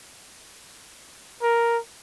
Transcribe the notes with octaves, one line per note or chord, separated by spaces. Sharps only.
A#4